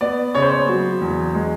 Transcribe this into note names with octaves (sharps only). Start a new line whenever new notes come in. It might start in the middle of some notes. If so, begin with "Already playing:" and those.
B3 D5
C#3 C#5
C5
C#5
F#3
E2
G#3